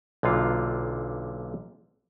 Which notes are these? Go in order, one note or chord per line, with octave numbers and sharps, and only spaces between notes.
B1 A#2 D3 F4